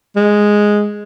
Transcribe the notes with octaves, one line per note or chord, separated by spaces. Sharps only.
G#3